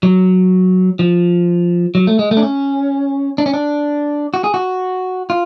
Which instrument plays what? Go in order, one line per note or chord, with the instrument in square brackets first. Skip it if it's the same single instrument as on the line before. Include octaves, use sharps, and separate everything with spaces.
[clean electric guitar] F#3
F3
F#3
A3
G#3
A3
D4
C#4
D4
C#4
D4
F#4
G#4
F#4
F4